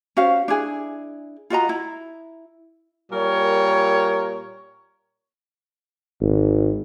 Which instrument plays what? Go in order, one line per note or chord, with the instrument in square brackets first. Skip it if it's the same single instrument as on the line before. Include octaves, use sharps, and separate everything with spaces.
[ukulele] C#4 F#4 C5 F5
D4 E4 G#4
F4 F#4 D#5 A#5
E4
[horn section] A#2 G3 A#4 C#5
[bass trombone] G#1